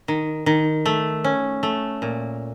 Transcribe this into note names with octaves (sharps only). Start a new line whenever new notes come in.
D#3
D#3
A3
C#4
A3
A#2